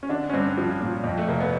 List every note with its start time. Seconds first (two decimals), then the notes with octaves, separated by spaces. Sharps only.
0.03 C#4
0.09 D3 D4
0.29 C#4
0.33 G2 C4
0.58 F3
0.81 A#2
1.04 F2
1.18 A3
1.28 F1 A#3
1.40 B3